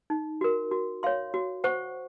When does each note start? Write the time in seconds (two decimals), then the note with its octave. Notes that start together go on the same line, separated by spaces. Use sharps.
0.10 D#4
0.41 F#4 A#4
0.71 F#4
1.03 C#5 F5 C6
1.34 F#4
1.64 C5 F#5 C#6